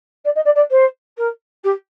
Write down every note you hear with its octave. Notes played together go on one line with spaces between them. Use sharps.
D5
D#5
D5
D5
C5
A#4
G4